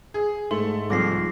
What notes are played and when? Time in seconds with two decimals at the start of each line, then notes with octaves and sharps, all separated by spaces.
0.14 G#4
0.51 G#2 A3 C6
0.90 C2 F3 D6 A#6 C7